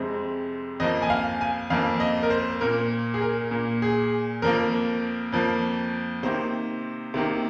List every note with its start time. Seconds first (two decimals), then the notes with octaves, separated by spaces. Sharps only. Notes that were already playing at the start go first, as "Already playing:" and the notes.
Already playing: F2 C3 G#3 C4 C6
0.80 F2 F3 A#3 D#5
1.02 G#5
1.10 F5
1.41 G#5
1.70 F2 F3 A#3 F5
2.00 D#5
2.23 A#4
2.30 C5
2.61 A#2 A#3 A#4
3.14 G#4
3.22 A#4
3.51 A#2 A#3
3.82 G#4
4.42 F2 F3 A#3 A#4
5.32 F2 F3 A#3
6.23 C3 D#3 A#3 C5
7.14 C3 D#3 A#3